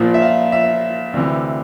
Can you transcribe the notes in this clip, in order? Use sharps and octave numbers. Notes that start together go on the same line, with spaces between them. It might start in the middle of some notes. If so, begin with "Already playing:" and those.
Already playing: A#1 A#2 F3
E5
F5
E5
D2 C3 E3